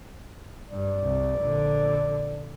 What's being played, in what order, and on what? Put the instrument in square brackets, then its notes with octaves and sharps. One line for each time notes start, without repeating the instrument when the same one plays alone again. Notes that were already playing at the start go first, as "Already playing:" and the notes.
[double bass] G2 [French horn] D5
[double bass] C2
A#1 D3